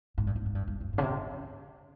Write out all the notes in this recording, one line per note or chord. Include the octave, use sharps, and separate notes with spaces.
G#2
G2
G#2
G#2
G2
G2
G2
G#2
C#3
C3